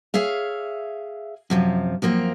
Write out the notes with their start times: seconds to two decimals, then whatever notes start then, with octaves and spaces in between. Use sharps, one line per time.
0.14 G#4 C#5 E5 F5
1.50 F#2 C3 F3
2.02 F#2 F3 A#3 C4